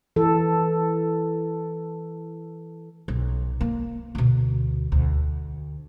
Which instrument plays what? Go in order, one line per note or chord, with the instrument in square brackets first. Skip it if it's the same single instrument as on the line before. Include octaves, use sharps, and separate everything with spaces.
[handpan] E3 A4
[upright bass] B1
A#3
D2 B2
D2